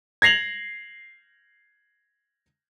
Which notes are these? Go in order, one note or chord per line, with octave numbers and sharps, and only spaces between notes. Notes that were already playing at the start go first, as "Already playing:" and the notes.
G#6 A#6 C7 F7 F#7